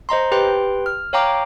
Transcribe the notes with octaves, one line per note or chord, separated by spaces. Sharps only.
C5 D#5 A#5 C6
G4 B4 G5 C6
F6
C#5 F5 G5 A#5 D6